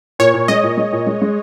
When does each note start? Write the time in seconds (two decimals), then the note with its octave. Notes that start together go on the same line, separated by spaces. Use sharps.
0.19 A#2 C#5
0.34 A#2
0.48 G#3 D#5
0.63 A#2
0.77 G#3
0.92 A#2
1.07 G#3
1.22 G#3